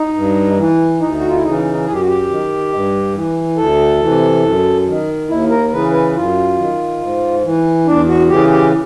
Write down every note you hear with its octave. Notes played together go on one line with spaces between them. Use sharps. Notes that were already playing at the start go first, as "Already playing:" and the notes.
Already playing: D#4
G2
E3
D2 D#4
F#4
F4
E4
C#3 E3 D#4
F#2 G#4
G4
F#4
G4
D#3
G2
E3
D2 A4
C3 E3
F#2
D#3
D#2 E4
A#4
C#3 E3 B4
B4
F#2 F4
D#3
G#2
E3
E2 D4
F#4
C#3 E3 G4
G4